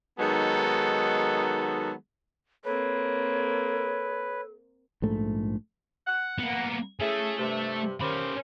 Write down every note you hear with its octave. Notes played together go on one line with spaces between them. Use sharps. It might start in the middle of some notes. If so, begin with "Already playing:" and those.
D#3 F#3 G#3 B3 D#4 A4
A#3 C4 A4 B4 C#5
A#1 G#2 A3
F#5
A#3 B3
A3 C#4 E4 G#4 A4
G2 C3
C#4 G4 A#4 C5 B5